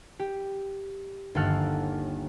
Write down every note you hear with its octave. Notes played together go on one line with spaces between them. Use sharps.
G4
G1 D#2 A#3 A4 F#5 F6